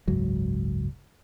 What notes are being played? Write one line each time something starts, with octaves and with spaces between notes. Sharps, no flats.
F#1 C#2 G#2 F#3